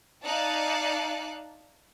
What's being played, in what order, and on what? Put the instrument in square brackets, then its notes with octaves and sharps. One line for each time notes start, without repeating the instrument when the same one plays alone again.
[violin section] D#4 D5 F5 A5 F#6 C#7